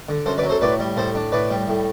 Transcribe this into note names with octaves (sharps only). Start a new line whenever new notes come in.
D3
F#2 A4 C5
B4 D5
F#3
A4 C5
A2 B4 D5
G3
A2 A4 C5
D4
A2 B4 D5
G3
A2